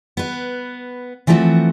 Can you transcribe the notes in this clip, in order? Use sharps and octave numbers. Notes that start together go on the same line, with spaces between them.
B3 B4
E3 F3 A3 C4 F#4